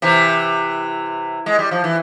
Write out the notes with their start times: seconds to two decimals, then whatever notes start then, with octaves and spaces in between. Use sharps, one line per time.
0.02 C3 E3
1.46 G#3
1.59 G3
1.71 F3
1.84 E3